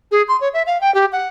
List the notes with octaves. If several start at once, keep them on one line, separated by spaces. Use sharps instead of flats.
G#4
C6
C#5
E5
F5
G5
G4
F#5